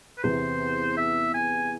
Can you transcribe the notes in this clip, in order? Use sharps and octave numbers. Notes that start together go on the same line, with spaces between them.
B4
E2 C3 E3 B3 C5
E5
G#5